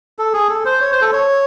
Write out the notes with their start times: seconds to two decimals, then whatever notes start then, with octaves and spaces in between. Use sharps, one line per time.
0.19 A4
0.33 G#4
0.49 A4
0.65 C5
0.81 C#5
0.92 C5
1.01 A4
1.13 C#5